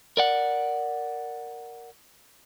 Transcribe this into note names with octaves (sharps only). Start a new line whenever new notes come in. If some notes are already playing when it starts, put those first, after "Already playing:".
A#4 D5 F#5